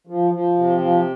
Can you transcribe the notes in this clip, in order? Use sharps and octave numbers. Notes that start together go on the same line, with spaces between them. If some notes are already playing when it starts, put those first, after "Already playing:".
F3
F3
C3
F3